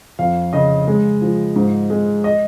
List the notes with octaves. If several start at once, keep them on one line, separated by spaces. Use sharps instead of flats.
F2 F5
C#3 D#5
G#3
F3
G#2
G#3
D#5